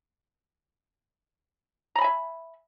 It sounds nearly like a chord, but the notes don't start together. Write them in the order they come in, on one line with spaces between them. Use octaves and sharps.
A#5 B5 G#5 E5